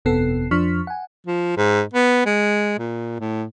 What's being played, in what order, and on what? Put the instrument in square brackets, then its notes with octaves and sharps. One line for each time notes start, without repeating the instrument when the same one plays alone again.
[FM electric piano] G1 F2 C3 B3 A4 C7
F2 F3 D4 C#6 F6 B6
F#5 G#5
[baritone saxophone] F3
G#2
B3
G#3
A#2
A2